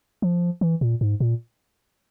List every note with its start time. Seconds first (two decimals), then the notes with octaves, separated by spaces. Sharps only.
0.22 F3
0.61 E3
0.81 A#2
1.01 G#2
1.20 A#2